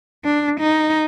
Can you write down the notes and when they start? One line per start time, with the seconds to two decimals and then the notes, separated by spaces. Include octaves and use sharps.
0.25 D4
0.61 D#4